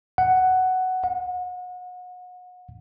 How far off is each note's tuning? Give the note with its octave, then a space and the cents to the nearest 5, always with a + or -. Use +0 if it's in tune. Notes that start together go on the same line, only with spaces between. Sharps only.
F#5 +10
F#5 -30